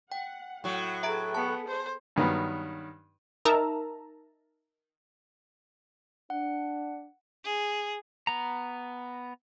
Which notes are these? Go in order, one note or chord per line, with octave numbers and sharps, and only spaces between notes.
F#5 G5
A2 F#3 F#5
G#4 A4 B4 E5 A#5 D7
B3 A5 C#7
C5
G2 D#3 F#3 B3
D#4 A#4 E5 A5 A#5
D4 F#5
G#4
B3 A#5